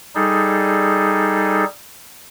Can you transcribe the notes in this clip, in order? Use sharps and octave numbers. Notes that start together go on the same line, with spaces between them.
G3 D#4 G#4 A4